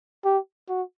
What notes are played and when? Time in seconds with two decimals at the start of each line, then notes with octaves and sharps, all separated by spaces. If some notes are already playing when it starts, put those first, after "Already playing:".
0.25 G4
0.69 F#4